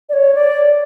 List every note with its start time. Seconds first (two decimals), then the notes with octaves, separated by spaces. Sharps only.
0.09 D5
0.13 C#5
0.35 D5